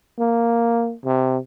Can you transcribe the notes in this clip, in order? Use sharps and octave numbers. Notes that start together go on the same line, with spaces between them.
A#3
C3